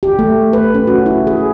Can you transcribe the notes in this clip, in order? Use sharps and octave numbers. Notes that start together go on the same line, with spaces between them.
G4
A3
B4
C#4
F#4
E4
G#4